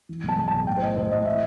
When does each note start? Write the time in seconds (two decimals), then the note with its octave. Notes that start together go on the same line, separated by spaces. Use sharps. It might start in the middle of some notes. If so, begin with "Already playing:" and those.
0.09 E3
0.23 B1
0.29 A5
0.37 B1
0.48 A5
0.53 B1
0.67 A2 G5
0.77 C5
0.82 A2 D#5
0.97 A1 C5
1.11 A2 D#5
1.25 A2 E5